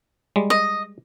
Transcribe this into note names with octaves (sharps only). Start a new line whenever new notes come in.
G3 G#3
D#5